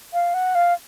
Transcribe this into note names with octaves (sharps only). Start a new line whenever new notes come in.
F5
F#5
F5